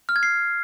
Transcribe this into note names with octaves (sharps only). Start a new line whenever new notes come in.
F6
G#6
C7